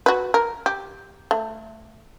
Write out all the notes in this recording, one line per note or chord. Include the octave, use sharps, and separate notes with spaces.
F#4 B4
A#4
G4
A3